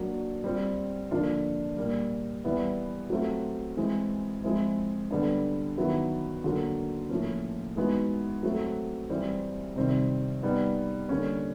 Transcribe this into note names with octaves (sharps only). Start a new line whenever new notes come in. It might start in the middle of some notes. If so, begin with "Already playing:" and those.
Already playing: F#3 A#3 D4 F#4
G3 C4 F4
D3 F3 A#3 D4 F4
A#2 G3 A#3
E3 G3 B3 E4
F#3 A3 C4 F4
E3 G#3 C4 E4
F3 G#3 C4 E4
D3 G3 B3 D4
D#3 F#3 B3 E4
D3 F#3 A#3
A2 F3 A#3 C#4
E3 G#3 B3 D#4 F#4
F#3 A3 C4
E3 G3 C4
C3 D#3 G3 C4
G3 B3 D#4
D3 G3 A#3 C#4